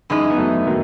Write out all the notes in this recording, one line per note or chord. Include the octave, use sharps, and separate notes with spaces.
F#2 E3 G#3 D#4
B3
F#3 A3
D#3 F#3